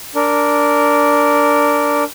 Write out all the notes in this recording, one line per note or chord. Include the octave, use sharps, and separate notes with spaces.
D4 A#4